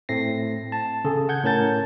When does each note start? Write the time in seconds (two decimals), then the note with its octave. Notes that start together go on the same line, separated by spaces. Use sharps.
0.09 A2 A3 C4 A#6 C7
0.72 A5
1.05 C#3 G#4 A4
1.29 F#5 G6 G#6
1.44 A2 C#4 A#4 A5 G6 A6